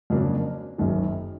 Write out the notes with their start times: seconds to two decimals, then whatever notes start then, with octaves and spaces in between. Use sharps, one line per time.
0.10 F2 C#3 F#3 A#3 D4
0.78 F#1 F#2 D#3